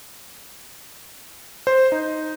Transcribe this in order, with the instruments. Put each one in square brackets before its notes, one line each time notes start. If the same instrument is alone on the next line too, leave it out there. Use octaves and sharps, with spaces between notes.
[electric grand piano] C5
D#4